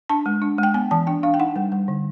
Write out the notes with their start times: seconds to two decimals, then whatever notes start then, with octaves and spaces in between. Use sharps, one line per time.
0.09 D4 A5
0.26 G#3
0.42 D4
0.58 G#3
0.63 G5
0.74 B3 G#5
0.91 E3 A5
1.07 D4 G5
1.23 D4 F5
1.34 G5
1.39 D#4 F#5
1.56 G3
1.72 G3
1.88 D3